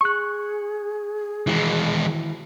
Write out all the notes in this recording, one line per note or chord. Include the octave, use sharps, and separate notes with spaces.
G#4 C#6 F#6
D#3 E3 G#3 E4 F#4